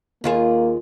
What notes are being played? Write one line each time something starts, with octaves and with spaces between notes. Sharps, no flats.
D#2 A#3 F4 G#4